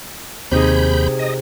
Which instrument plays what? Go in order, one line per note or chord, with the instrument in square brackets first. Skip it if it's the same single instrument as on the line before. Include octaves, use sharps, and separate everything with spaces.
[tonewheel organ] D#2 B5 G6 [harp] C3 D#4 G#4
[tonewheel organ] D#5